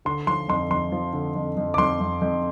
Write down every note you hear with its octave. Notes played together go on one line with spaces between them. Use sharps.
D3 C6
F3 C6
F2 C6
F2 C6
F3
D3
F2
F2
D6
F2 C6
F2
F2